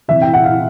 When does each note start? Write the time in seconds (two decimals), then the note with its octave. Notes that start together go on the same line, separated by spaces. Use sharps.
0.08 C3 E3 E5
0.22 G5
0.34 F#5
0.44 F5